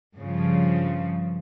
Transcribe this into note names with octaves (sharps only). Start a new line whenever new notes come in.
G2 C#3 F3